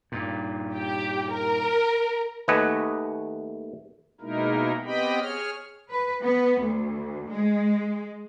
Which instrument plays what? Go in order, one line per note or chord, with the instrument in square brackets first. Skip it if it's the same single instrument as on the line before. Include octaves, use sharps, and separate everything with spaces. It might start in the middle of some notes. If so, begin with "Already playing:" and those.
[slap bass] G2 A#2
[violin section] G4
A#4
[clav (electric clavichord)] D#2 A3 B4 D#5 F#5 G#5
[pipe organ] B2 G#3 A#3 D#4 E4 A#4
B3 C4 G4 D#5 G5 B5
G#4 C#5 F6
[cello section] B4
B3
D2
G#3